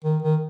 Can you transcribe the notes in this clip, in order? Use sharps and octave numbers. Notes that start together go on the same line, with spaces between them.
D#3
D#3